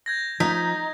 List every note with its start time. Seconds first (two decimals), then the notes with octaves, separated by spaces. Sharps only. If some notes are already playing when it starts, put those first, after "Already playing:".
0.06 G6 G#6 A#6
0.40 F3 D#4 A#5 B6